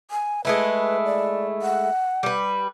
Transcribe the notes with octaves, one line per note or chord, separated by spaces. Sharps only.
G#5
G#3 A3 E4 B4
D5
F#5
G3 B4